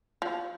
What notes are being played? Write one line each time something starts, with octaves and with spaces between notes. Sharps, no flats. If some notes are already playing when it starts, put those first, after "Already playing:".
F3